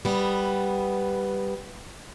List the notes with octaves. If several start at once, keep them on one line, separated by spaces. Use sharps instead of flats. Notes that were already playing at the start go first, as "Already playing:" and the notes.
G3 B3